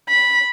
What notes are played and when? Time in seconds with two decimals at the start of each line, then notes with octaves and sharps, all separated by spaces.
0.09 B5